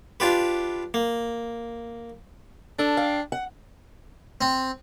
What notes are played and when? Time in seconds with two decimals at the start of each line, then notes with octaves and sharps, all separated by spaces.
0.20 D4 F4 G4 B4
0.94 A#3
2.79 D4 A4
2.97 F5 G5
3.32 F#5
4.41 C4